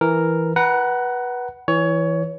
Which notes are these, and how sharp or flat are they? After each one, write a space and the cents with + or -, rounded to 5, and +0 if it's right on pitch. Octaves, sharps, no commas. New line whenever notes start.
E3 +0 A#4 +0
B4 -20 F#5 +15 A#5 +0
E3 +0 C#5 +20